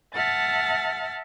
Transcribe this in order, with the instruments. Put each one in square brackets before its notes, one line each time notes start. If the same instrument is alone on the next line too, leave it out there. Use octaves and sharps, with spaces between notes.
[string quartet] E5 F#5 A5 F6 A6